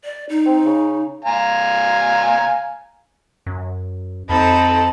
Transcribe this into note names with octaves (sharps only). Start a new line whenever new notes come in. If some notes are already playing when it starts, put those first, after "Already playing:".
D5
D#4
C4
C#3
F5 G#5 A#5
F#2
F2 C4 D#4 A4 A5 B5